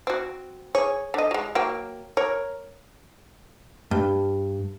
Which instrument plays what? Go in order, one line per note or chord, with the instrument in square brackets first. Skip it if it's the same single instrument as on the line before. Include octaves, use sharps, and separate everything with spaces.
[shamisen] C4 F#4
G#4 C#5
D3 D#5
F#3 G#3
F#3 A#3 G5
A#4 C#5
[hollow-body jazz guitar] G2